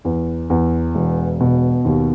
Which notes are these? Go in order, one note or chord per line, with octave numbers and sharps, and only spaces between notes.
E2
E2
E1
B2
D#2